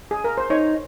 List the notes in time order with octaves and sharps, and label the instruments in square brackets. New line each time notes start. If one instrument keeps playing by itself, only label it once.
[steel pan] G#4
A#4
C5
[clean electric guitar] D#4 [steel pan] C#5